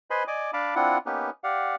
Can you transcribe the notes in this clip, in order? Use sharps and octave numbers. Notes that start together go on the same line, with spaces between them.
B4 C5 D#5 G#5 B5 C6
D5 D#5 G#5 D6
D4 F5 A5 B5 D6
C4 D4 E4 F4 F#5
A#3 B3 C#4 D#4 G4 B4
G4 D5 F5 F#5